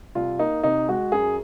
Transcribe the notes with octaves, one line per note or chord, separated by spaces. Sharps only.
C2 F4
A#3 D#4
C3 D#4
G#3 F#4
F#2 G#4